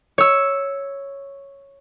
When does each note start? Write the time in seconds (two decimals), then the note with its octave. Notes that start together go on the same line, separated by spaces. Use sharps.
0.18 C#5 E6